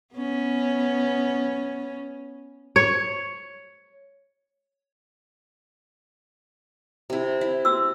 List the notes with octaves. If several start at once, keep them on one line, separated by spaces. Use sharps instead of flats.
B3 C#4
C#5
C3 E4
E4
F#4 E6